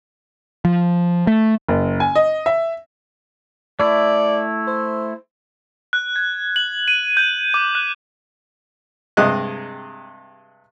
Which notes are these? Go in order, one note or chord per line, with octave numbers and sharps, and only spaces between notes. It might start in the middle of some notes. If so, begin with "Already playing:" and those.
F3
A3
F#1
G#5
D#5
E5
A3 E4 D5
C5
F#6
G#6
F#7
D#7
G6
D6
F#6
G2 C3 G#3 D#5 F#6